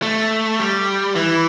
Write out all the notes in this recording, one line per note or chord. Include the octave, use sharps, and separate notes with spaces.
A3
G3
E3